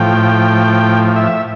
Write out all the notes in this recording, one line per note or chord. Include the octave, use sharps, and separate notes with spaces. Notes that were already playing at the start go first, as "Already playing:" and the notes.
Already playing: A2 F3 G5
E5